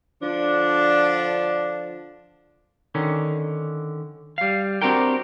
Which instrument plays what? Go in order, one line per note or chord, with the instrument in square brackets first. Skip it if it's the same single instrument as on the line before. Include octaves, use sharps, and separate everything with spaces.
[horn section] D3 F3 D4
[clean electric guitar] D3 D#3 C#4
G3 F5
C4 D4 F#4 G4 A#4 G5